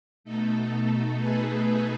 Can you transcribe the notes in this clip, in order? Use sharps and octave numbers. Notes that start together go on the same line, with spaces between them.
B2 A3 D#4 A4
G#4 B4